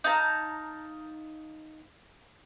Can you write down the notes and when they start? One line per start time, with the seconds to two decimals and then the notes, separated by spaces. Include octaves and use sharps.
0.04 D#4 F5 A5 A#5